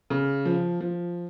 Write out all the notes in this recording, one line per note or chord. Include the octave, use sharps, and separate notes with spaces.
C#3
F3
F3